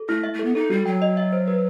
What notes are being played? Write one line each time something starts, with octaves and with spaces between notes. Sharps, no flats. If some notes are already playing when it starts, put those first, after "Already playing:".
Already playing: A4
A3 E4
E5
A3
B3 A4
D#4 A4
G3 F#4
F#3 G5
D#5
E5
C5
B4